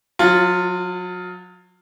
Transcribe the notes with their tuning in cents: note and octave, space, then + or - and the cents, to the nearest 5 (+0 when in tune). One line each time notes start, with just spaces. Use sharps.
F#3 -35 F4 +0